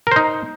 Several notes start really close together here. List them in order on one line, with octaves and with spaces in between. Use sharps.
A#4 C5 D#4